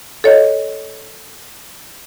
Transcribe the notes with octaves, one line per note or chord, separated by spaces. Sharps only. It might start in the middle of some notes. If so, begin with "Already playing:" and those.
A4 C#5 D#5